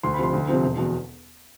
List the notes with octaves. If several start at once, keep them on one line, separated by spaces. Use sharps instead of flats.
D2 C6
B5
C3 F3 C6
D2
C3 F3 C4
E1
E2 B2